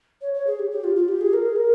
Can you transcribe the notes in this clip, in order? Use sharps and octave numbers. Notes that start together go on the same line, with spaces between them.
C#5
C#5
G#4
G4
G4
F4
F4
G4
G#4
A#4
G#4
A#4